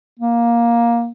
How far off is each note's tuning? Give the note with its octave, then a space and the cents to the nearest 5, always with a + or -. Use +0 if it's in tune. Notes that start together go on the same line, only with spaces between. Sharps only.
A#3 +10